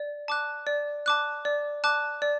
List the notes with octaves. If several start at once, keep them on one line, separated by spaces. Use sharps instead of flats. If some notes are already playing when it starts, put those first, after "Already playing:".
Already playing: D5
A5 D6 F#6
D5
A5 D6 F#6
D5
A5 D6 F#6
D5